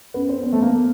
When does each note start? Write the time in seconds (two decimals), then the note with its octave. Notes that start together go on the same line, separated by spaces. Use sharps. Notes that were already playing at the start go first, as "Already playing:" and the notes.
0.14 B3 C#4
0.29 C4
0.43 B3 C4
0.53 A3
0.62 A#3